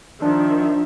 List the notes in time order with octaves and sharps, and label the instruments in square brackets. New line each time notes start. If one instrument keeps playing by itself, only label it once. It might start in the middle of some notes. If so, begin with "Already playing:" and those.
[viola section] D#3 F3 E5 [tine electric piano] D4